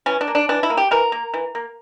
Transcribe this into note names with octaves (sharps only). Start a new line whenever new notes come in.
E3 C#4
D4
A#3
D4
E3 D4
E4
A#3
G4
E3 A#4
A#3
E3
A#3